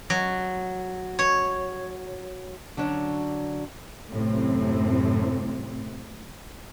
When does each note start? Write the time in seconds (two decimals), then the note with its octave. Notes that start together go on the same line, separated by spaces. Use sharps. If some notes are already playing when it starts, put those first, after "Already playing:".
0.10 F#3
1.19 C#5
2.77 D3 F#3 C#4 D4
4.12 F#2 A2 C3 C4